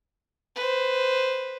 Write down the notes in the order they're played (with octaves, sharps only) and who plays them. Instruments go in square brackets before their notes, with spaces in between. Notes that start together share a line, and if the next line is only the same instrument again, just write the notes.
[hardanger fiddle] B4 C5